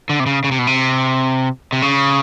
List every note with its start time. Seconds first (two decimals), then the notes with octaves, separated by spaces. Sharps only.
0.09 D3
0.20 C3
0.26 C#3
0.44 C#3
0.51 C3
0.59 B2
0.67 C3
1.73 C3
1.82 C#3